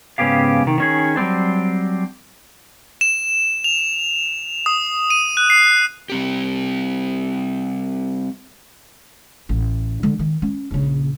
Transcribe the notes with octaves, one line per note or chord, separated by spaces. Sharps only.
G#2 C#3 B3 C#4 G4 F5
C3 D#3
D#3 C#4 G#4
F#3 G3 C4 D4
E7
F7
D#6
D#7
F#6
C7
G3 C4 G4
A1
D3
D#3
C#4
A#1 C#3